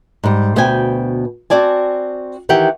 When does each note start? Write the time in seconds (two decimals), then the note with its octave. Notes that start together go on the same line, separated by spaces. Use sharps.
0.23 G#2 G3
0.56 D2 B2 B3 C5 G5 G#5
1.50 C4 F#4 D5 G#5 A5
2.49 D#3 E3 G4 F#5 G5